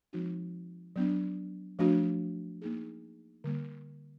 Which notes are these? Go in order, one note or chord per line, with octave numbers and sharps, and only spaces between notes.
F3 G#3 C4 D#4 F#4
F#3 B3 D4
F3 A3 D4 F#4
A#3 D#4 G#4
D3 G3 A#3